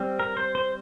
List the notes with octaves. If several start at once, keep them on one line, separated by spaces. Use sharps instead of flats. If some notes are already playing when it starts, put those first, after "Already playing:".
Already playing: G3 C4
A#4
C5
C5